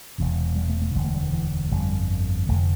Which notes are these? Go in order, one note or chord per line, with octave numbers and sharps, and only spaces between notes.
E1 E2 C3
G3
A3
A3
E1 D2 D3 G3
A3
G3
E3
E3
G1 F2 D3 G3
F1 F2 D3 A3